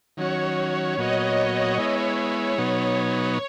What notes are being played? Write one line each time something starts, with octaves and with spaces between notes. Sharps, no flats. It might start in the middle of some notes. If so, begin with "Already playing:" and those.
D#3 F#3 C#4 F#4 C#5
A#2 F#3 B3 F#4 D#5
D#5
G#3 B3 E4 C#5
B2 F#3 B3 D#4 C#5